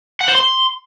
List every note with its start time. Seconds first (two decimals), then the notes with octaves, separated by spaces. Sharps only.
0.21 F#5
0.28 C5
0.35 C6